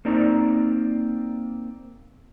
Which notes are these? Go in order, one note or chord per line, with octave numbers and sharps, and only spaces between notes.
A#3 C4 D#4 D5 A#5